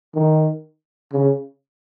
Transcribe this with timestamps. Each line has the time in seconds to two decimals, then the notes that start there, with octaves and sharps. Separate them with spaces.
0.15 D#3
1.12 C#3